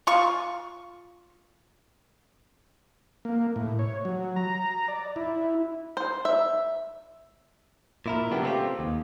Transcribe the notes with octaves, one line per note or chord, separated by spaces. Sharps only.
F4 C#6
A#3
A2
C#5
F#3
A#5
D5
E4
C5
E5
A#2 E4 A#4
C#3 F#3 B3 D4 G4
A3 C4 D4 E4 F4 G4
D#2